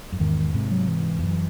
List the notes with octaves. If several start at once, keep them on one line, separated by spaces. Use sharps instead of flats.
F#2
E2 G#2 D#3
G#2 C3
F#3
E3
E2
F#2